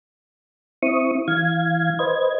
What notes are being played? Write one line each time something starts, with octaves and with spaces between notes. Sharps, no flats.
C4 E4 C#6 D#6
E3 F5 G#6
B4 C5 D#5 G#6